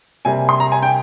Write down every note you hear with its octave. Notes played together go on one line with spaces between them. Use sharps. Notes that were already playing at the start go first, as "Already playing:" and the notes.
C3 G3 A#3 G#5
C6
A#5
G#5
G5